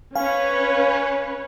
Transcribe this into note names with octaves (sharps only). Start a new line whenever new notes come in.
C#4 B4 C#5 F5 G#5